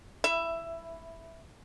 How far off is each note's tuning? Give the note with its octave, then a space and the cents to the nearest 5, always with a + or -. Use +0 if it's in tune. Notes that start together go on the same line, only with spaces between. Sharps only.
E4 +0 E5 +15